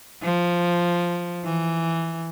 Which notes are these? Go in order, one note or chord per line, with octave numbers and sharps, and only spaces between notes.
F3
E3